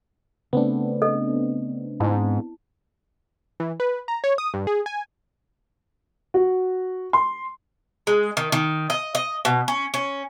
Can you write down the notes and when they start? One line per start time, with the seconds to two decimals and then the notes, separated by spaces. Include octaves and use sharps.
0.53 C#3 A3 B3 C4 D4
1.02 A4 D#5
2.00 G#2 E4 A5
3.60 E3
3.80 B4
4.08 A#5
4.24 C#5
4.38 D#6
4.54 G2
4.67 G#4
4.86 G#5
6.34 F#4
7.13 C6
8.07 G#3
8.37 D#3
8.52 D#3
8.90 D#5
9.15 D#5
9.45 B2
9.68 C#4
9.94 C#4